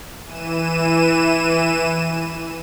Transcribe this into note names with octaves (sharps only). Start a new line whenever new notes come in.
E3 D#7 E7